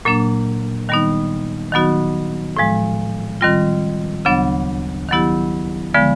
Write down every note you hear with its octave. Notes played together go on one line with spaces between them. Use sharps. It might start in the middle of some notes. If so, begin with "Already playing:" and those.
A#2 F#3 A#3 D4
D#3 G3 B3 D#4
D#3 F#3 B3 D#4 F#4
A2 F3 G#3
D#3 G3 C4 F4
D2 C#3 F#3 B3 D4
D#3 F#3 B3 E4 G4
D3 F3 G#3 B3